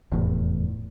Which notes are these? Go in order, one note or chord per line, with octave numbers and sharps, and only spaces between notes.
F1 E2 A2